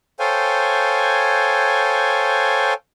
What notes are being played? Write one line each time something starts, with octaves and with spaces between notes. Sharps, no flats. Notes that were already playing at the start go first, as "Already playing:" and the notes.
A4 C5 C#5 F5 G5 G#5